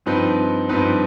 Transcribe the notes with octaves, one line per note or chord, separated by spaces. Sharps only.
G2 F3 C4 D#4 B4
G2 F3 C4 D#4 B4